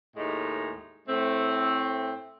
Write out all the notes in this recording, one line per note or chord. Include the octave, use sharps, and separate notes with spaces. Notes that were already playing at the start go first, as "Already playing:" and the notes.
D#2 A2 G#3 D#4
A2 A3 C4